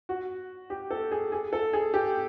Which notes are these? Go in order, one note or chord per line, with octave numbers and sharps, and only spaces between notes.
F#4
G4
A4
G#4
G#4
A4
G#4
G4